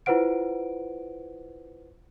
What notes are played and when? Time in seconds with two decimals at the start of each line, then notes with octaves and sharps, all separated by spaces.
0.06 E4 F4 B4 C5 F#5 D7